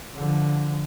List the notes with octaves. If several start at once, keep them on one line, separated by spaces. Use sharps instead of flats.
D3 F3